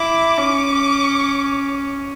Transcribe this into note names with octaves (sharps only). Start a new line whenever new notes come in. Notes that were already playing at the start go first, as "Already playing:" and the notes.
Already playing: E4 D6
C#4